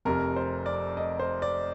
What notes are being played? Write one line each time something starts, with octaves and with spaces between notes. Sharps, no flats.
F1 F2 C3 A#4
C5
D5
D#5
C5
D5